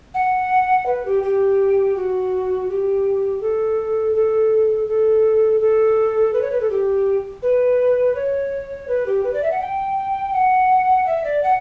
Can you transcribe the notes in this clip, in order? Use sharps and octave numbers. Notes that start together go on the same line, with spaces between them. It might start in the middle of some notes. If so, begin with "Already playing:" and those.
F#5
B4
G4
G4
F#4
G4
A4
A4
A4
A4
B4
C#5
B4
A4
G4
B4
C#5
B4
G4
B4
D5
E5
F#5
G5
F#5
E5
D5
F#5